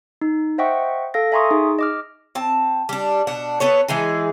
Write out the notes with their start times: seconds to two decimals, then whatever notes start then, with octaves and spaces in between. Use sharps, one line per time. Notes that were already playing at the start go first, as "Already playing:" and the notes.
0.21 D#4
0.58 C5 D#5 E5 F#5 G5 C#6
1.14 A4 F5 A#6
1.32 E5 G#5 A#5 C6 C#6 D#6
1.51 D#4 G#4
1.79 D#5 D6 F6
2.35 C4 A5
2.89 G3 D4
3.27 B2 D4 F#5
3.60 B3 A4 C#5
3.88 E3 G#3 D#4 G#4